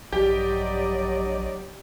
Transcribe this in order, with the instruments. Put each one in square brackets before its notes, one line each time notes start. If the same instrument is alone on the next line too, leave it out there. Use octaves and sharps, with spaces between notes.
[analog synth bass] A#1 [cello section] G2 D5 D#5 [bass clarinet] F#3 [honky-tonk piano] G4